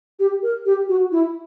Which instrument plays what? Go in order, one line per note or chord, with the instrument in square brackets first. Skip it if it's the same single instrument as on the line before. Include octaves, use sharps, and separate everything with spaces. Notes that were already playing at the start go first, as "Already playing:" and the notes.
[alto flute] G4
A#4
G4
F#4
E4